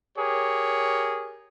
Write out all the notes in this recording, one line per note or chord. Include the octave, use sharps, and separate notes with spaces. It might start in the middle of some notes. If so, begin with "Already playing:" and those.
G4 G#4 A#4 C#5